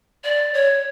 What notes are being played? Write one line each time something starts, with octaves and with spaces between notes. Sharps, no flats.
D5
C#5